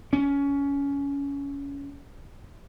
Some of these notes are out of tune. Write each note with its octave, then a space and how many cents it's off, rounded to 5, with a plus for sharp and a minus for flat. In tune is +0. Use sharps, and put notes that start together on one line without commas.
C#4 +20